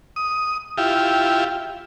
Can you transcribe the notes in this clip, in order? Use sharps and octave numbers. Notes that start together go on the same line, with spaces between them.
D#6
E4 F4 G4